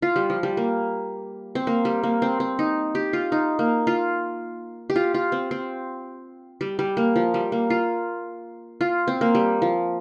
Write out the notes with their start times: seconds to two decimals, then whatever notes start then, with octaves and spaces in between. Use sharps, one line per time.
0.02 F4
0.16 G3
0.30 F3
0.43 G3
0.57 A#3
1.55 C4
1.67 A#3
1.85 G3
2.03 A#3
2.22 C4
2.40 C4
2.59 D#4
2.95 G4
3.13 F4
3.32 D#4
3.59 A#3
3.87 F4
4.90 G4
4.96 F4
5.14 F4
5.32 C4
5.51 C4
6.61 G3
6.79 G3
6.97 A#3
7.16 F3
7.34 G3
7.52 A#3
7.70 F4
8.81 F4
9.07 C4
9.21 A#3
9.35 G3
9.62 F3